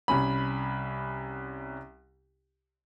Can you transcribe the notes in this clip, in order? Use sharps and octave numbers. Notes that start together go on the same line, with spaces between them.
C2 C#4 B5